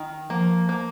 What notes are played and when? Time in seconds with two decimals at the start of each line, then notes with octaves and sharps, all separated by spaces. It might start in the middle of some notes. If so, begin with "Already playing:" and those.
Already playing: D#3
0.30 F3 A#3
0.69 A#3